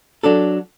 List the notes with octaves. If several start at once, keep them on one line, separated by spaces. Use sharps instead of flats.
F#3 D4 A4